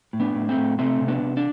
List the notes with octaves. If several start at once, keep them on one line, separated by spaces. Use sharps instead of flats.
A2
B3 D4
A2
A3 C4
A2
C3 A3 C4
C3
B3 D4
C3
D4